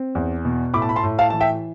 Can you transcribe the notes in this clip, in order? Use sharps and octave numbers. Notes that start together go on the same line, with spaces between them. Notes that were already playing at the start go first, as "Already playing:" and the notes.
Already playing: C4
E2
B2
A2 B5 D6
A5
B5
A5 C6
A2
F5 A5
E3 A5
E5 G5